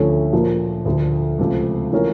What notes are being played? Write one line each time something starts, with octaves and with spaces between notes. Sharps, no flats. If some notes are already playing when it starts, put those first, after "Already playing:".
Already playing: D2 D3 F3 A3 C#4
A#2 F3 A#3
D2 D3 F3
C#2 C3 F3 A3 C4
E3 A3 C#4 F4 A#4